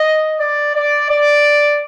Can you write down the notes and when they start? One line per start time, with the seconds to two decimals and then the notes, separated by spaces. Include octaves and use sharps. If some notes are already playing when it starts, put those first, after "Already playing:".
Already playing: D#5
0.39 D5
0.74 D5
1.09 D5